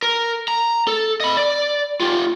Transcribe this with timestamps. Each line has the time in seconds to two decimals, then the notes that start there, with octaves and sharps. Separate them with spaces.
0.02 A#4
0.48 A#5
0.87 A4
1.20 D#5 B5
1.37 D5
2.00 F4 G4